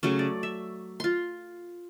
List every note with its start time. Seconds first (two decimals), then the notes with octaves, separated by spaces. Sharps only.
0.03 C#3 F#3 A3 C#4
0.19 D5
0.43 E5
1.00 F4 C6